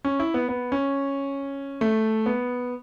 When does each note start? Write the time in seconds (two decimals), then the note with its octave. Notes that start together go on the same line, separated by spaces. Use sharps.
0.05 C#4
0.20 E4
0.34 B3
0.49 B3
0.72 C#4
1.81 A3
2.26 B3